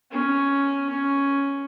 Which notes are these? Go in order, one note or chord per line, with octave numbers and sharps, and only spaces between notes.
C#4
C#4